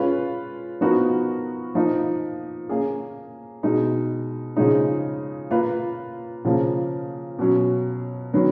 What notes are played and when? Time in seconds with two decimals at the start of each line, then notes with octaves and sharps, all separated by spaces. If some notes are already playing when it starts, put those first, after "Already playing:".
Already playing: G#3 C#4 F4 B4
0.81 F3 B3 D#4 F#4 A#4
1.75 F3 A#3 D#4
2.69 A#3 C#4 G#4
3.63 B2 G#3 D#4
4.56 C#3 F3 G#3 D#4
5.51 A#3 F4 B4
6.45 C#3 F3 A#3
7.39 B2 F#3 C#4
8.33 D#3 F#3 B3